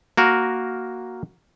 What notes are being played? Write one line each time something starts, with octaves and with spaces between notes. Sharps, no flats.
A#3 F#4 A#4